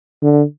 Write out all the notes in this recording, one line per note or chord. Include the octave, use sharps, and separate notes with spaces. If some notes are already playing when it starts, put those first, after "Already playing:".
D3